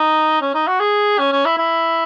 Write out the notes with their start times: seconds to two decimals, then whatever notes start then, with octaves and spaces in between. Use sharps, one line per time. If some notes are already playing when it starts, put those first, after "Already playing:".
Already playing: D#4
0.41 C#4
0.54 D#4
0.68 F#4
0.80 G#4
1.19 C#4
1.32 C#4
1.45 E4
1.58 E4